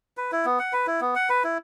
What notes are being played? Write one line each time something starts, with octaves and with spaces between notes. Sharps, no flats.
B4
E4
B3
F#5
B4
E4
B3
F#5
B4
E4